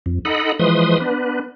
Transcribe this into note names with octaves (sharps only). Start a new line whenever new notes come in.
F2
D#4 A4 D#5 F#5 B5
E3 F3 G#3 B4 C6 D#6
B3 D4 B4